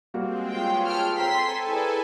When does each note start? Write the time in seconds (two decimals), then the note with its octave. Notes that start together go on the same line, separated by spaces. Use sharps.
0.14 G3 G#3 A#3 C4 F#4
0.50 F4 G#4 B4 C#5 F5 G5
0.86 A4 G5 E6 F6
1.19 C4 A4 G5 G#5 A#5 C6 B6
1.68 E4 G#4 B4 D5